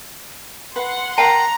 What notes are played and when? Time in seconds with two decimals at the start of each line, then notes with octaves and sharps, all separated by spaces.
0.76 B4 F#5 C6
1.18 A#4 F5 G5 A5 A#5